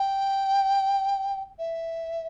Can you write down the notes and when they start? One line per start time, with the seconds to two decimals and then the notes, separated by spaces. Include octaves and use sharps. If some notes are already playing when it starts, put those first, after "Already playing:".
Already playing: G5
1.59 E5